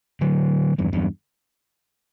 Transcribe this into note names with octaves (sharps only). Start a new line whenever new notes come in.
D3 F#3
E2 G2
E2 G2